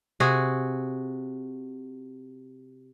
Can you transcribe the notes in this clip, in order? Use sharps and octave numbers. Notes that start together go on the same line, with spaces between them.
C3 F#4 G#4